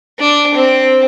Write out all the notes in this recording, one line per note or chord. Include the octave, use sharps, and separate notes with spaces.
D4
C4